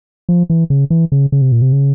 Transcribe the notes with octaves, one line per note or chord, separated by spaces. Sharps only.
F3
E3
C#3
E3
C#3
C#3
C3
A#2
C3
C#3